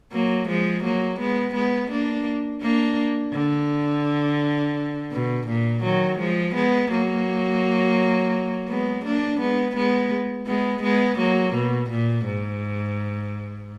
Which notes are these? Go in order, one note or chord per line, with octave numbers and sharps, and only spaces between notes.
F#3 A#3
F3 G#3
F#3 A#3
G#3 B3
G#3 B3
A#3 D4
A#3 D4
D3
B2
A#2
D#3 F#3
F3 G#3
G#3 B3
F#3 A#3
G#3 B3
A#3 D4
G#3 B3
G#3 B3
G#3 B3
G#3 B3
F#3 A#3
B2
A#2
G#2